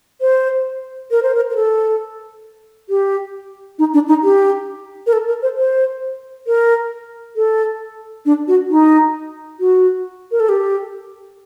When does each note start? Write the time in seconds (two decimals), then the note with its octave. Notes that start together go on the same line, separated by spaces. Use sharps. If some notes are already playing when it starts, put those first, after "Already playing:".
0.21 C5
1.11 A#4
1.23 C5
1.35 A#4
1.50 A#4
1.56 A4
2.89 G4
3.79 D#4
3.94 D4
4.08 D#4
4.23 G4
5.07 A#4
5.13 A4
5.27 A#4
5.42 C5
5.57 C5
6.47 A#4
7.36 A4
8.26 D4
8.48 F#4
8.70 D#4
9.60 F#4
10.31 A#4
10.40 A4
10.49 G4